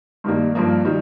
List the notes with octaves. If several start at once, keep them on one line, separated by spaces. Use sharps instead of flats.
G2 D#3 G3 A#3
G2 F3 A#3
D#3 G3